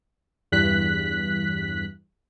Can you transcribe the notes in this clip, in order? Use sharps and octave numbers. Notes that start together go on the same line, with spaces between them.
E2 G2 F#6 B6